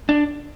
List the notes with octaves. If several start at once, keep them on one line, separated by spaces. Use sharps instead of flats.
D4